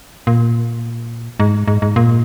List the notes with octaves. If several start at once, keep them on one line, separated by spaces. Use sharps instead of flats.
A#2
G#2
G#2
G#2
A#2